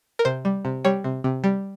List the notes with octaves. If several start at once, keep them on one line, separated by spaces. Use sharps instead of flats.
A#4
C3 C5
G3
C3
G3 C#5
C3
C3
G3